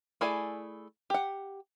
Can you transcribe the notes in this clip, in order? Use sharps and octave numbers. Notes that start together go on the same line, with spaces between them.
A3 E4 G#4 D5 G#5
G4 F#5